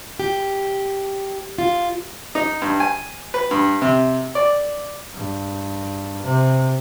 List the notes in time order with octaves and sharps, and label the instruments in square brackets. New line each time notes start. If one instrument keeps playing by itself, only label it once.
[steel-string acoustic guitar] G4
F4
[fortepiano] D#4
G2
G#5
B4
G2
C3
D5
[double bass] G2
C3